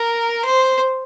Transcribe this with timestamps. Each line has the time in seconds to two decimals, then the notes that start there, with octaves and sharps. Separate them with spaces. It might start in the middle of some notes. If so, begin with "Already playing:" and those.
Already playing: A#4
0.45 C5